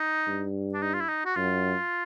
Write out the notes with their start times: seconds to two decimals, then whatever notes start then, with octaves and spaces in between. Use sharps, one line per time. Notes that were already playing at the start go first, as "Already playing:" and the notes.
Already playing: D#4
0.28 G2
0.73 D4
0.82 D#4
0.94 F4
1.01 E4
1.09 D#4
1.25 F#4
1.35 F#2 F4